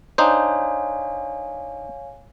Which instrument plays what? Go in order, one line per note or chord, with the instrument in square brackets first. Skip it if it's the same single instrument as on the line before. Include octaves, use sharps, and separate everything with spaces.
[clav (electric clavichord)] D4 D#4 C5 [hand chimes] C#5 F5 G#5